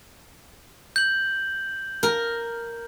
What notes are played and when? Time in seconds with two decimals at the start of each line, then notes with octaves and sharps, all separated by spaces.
0.96 G6 F#7
2.03 A#4